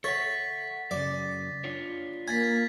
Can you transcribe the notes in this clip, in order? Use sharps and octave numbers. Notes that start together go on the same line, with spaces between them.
A4 C#5 E5 F#5 A6 B6
F#2 A2 C#3 D5
D4 F4 C#5
A#3 G#5 G#6 A6 B6